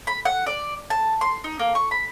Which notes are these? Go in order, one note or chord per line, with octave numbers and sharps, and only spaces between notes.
B5
F#5
D5
A5
C6
D#4
A#3
C#6
B5